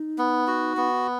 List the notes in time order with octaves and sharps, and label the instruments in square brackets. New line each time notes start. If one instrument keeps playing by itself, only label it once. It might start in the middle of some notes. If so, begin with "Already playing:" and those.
Already playing: [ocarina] D#4
[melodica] B3
F#4
B3